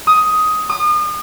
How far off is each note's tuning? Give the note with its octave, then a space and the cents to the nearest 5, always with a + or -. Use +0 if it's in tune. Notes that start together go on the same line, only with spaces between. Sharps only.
D#6 +10
D#6 -35